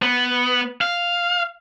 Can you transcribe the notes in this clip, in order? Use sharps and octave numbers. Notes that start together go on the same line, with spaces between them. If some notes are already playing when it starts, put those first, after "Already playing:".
B3
F5